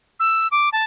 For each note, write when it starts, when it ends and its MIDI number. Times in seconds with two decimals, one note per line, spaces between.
0.20 0.47 88
0.52 0.69 86
0.73 0.84 81